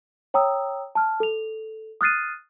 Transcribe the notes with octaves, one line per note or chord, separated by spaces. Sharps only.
C#5 G5 A#5 D#6 E6
A5 F6
A4 F7
D#6 F6 F#6 A6 C7 D#7